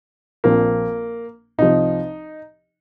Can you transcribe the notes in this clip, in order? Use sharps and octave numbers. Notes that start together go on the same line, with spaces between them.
A#1 A#2 F3 A#3 C4
C2 C3 F3 D#4